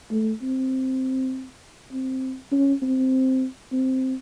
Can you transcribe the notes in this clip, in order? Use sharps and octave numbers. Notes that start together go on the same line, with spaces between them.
A3
C4
C4
C#4
C4
C4